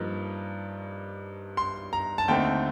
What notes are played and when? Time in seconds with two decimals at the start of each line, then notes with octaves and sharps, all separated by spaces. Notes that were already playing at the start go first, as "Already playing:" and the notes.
Already playing: G2 F3 A#3 D#4
1.57 C6
1.93 A#5
2.18 A5
2.28 D#2 D3 A3 C4 D#4 G5